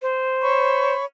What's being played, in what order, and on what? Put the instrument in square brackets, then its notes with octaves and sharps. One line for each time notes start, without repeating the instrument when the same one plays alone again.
[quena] C5
[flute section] C#5 B5 C#6